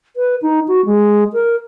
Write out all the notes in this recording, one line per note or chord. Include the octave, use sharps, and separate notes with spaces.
B4
D#4
F#4
G#3
A#4